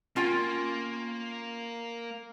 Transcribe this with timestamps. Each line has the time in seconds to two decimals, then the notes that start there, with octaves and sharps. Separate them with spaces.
0.16 A#3 C#4 F4 G5